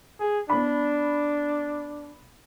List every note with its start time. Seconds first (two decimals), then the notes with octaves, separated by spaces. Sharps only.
0.20 G#4
0.50 B3 D4 B5